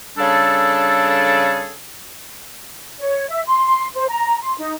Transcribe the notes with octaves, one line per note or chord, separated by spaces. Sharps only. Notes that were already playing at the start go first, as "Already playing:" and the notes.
C#3 G3 D4 G#4 A4
C#5
E5
C6
C5
A#5
C6
D#4